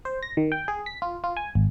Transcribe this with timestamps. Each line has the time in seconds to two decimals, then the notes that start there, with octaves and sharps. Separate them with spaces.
0.05 C5
0.23 A#6
0.37 D#3
0.52 G5
0.68 G#4
0.86 B6
1.02 F4
1.24 F4
1.37 G#5
1.55 G#1